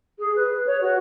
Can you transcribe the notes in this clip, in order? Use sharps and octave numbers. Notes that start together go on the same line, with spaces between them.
G#4
B4
C#5
F#4